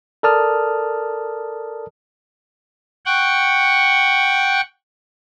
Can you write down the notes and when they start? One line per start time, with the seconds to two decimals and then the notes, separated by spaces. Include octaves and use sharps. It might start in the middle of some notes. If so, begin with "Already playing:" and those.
0.23 A4 A#4 D5 A5 D#6 F6
3.06 F#5 G5 C#6